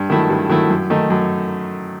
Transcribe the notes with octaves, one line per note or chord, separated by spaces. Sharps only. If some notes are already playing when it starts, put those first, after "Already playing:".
Already playing: G2
D#3 F#3 A3 E4
G2
D#3 F#3 A3 E4
F#2
D#3 A3 D#4
F#2